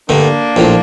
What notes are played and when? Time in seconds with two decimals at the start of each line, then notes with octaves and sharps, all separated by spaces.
0.09 G2 D3 A3 A#3 D4
0.56 A#1 A2 F3